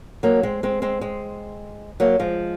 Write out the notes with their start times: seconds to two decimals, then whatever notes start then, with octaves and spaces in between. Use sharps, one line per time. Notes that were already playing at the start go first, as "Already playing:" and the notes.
0.23 F#3 A#3
0.43 G#3 C4
0.63 G#3 C4
0.82 G#3 C4
1.01 G#3 C4
2.00 F#3 A#3
2.19 F3 G#3